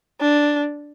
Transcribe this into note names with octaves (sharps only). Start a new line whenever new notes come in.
D4